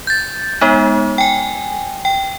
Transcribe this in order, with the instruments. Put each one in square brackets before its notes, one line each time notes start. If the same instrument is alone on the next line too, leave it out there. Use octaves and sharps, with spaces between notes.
[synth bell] G6 A6
G#3 B3 D#4
G5 G#5
G5